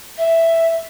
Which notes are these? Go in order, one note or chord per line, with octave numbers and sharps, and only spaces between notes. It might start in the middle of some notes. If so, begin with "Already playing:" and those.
E5